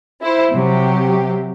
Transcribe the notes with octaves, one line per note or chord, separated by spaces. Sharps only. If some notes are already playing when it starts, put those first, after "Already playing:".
E4 C5
C3 F#3 G4